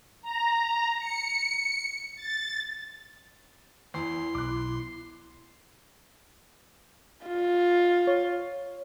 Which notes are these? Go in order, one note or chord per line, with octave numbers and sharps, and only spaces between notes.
A#5
C#7
A6
E2 E4 C6
B1 B2 D6 F#6
F4
C#5